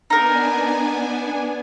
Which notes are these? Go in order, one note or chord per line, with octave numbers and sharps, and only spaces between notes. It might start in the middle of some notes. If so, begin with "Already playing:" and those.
B3 D4 D#4 A#4 G#5